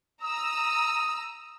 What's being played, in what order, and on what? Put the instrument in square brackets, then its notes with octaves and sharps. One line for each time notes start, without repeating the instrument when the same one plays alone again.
[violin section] A#5 E6 [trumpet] D#6